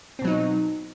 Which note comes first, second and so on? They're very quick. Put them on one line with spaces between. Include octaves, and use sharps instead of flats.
C4 B2 F#3 D#4